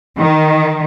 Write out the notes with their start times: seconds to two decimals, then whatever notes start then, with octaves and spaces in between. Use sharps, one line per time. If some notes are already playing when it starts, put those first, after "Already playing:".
0.18 D#3